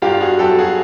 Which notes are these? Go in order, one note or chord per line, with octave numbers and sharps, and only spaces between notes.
G2 F4 G4
F#4 G#4
F#3 G4 A4
F#4 G#4